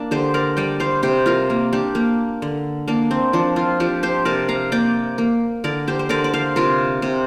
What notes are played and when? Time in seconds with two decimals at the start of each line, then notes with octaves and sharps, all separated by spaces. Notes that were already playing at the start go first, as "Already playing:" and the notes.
Already playing: A#3 D4
0.11 D3 G4 C5
0.34 A#4 D5
0.57 G3 D5 G5
0.80 C5 F5
1.03 C3 G4 C5
1.26 F4 A#4
1.50 A#3
1.73 D4 G4
1.95 A#3
2.42 D3
2.88 A#3 D4
3.11 C4
3.33 F3 D4
3.56 C4 F4
3.80 F3 D4 G4
4.03 G4 C5
4.25 C3 A#4 D5
4.48 F5 A#5
4.72 A#3 D5 G5
5.18 A#3
5.64 D3 A#4 D5
5.88 G4 C5
5.99 C5
6.09 D3 A#4 D5
6.24 D5
6.34 C5 F5
6.56 C3 F4 A#4
7.02 C3